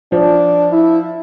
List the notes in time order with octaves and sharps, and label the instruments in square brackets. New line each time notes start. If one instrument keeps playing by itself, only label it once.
[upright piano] F3 [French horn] D4
[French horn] E4